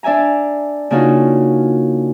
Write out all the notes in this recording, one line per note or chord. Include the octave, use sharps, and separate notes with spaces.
D4 D5 E5 G#5 A#5
C#3 A#3 D4 D#4 F4 F#4